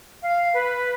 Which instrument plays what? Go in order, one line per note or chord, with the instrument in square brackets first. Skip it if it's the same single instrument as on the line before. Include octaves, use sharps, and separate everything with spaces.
[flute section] F5
B4